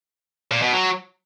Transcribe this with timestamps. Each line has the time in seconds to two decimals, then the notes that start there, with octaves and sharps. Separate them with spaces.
0.51 A#2
0.62 B2
0.73 F#3